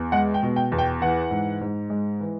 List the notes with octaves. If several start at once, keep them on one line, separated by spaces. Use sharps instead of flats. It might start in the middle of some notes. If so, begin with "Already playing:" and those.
Already playing: E2
G#3 F#5
G5
B2
G5
E2
G5
E3 F#5
G#2
G#2
G#3
E3